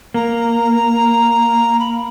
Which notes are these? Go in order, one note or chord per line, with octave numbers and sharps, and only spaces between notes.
A#3 A#5
B5